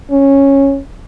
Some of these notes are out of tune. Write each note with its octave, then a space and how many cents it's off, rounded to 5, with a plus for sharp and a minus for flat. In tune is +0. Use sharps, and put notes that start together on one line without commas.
C#4 -10